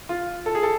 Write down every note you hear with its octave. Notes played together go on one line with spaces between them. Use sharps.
F4
A4
G#4
A4